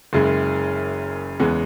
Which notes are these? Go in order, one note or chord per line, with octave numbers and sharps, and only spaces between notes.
F#1 F#2 C#3 G#3
E2 C#3 G#3 B3